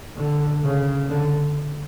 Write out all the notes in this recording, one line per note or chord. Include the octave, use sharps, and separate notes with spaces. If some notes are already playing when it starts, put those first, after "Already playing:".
D3
C#3
D3